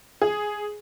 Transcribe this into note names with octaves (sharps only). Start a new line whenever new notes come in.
G#4